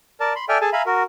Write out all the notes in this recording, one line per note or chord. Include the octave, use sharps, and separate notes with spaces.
A#4 D5 A5
B5 C6
A4 D5 E5 G5 G#5 F6
G#4 A4 G#5 A5
E5 F5 G#5 A#5 B5
F#4 A#4